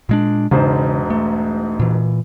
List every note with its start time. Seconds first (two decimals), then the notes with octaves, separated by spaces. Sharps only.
0.09 A#2 G#3 D4
0.51 E1 G#2 C#3 C5
1.10 A3
1.80 A#2 E3